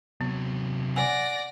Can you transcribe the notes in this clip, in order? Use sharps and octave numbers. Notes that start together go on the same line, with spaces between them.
C3 F#3 B3
D5 F#5 G#5 A#6